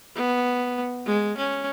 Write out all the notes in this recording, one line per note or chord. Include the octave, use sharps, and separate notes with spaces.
B3
G#3
C#4